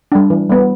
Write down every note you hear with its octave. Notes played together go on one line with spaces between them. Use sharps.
G3 D4
E3
G3 B3